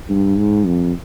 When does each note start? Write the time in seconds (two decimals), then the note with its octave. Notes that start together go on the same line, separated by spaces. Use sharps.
0.09 G2
0.38 G#2
0.66 F2